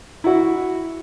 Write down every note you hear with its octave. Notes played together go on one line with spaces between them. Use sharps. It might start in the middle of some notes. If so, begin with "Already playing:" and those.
E4 F#4